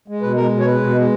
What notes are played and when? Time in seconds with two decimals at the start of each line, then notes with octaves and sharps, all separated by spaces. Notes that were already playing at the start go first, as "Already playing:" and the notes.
0.08 G#3
0.22 B2 B4
0.36 G#3 A#4
0.51 B2
0.60 C#5
0.66 G#3 B4
0.80 B2
0.96 G#3